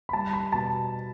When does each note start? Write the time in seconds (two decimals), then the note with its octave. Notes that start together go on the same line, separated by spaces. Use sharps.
0.09 B5
0.13 G3 A5
0.33 B5
0.52 B2 A5